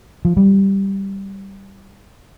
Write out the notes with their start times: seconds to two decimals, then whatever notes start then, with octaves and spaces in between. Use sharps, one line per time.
0.25 F3
0.37 G3